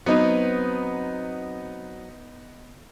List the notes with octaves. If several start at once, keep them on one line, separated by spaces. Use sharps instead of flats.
F#3 B3 C4 D#4 B4